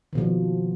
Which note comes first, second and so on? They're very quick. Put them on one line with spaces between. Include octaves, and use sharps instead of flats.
D#3 B2 F3